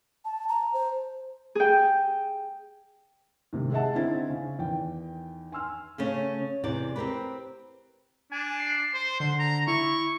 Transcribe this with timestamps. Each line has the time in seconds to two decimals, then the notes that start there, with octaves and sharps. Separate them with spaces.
0.25 A5
0.49 A#5
0.73 C5
1.55 G#4 G5
3.53 G#2 C3 D#3
3.72 G#4 D#5 E5 F#5 A5
3.94 D3 C4 D#4 E4 C5 A6
4.30 C#3
4.59 E2 D#3 G5
5.52 G#5 C6 E6 F6
5.98 C#3 A3 C#4
6.64 E2 C3 D5
6.96 C4 G4 A#4 B4
8.32 D4 G#5
8.59 C7
8.94 C5
9.20 D3 C6
9.39 A#5
9.67 E4 C#6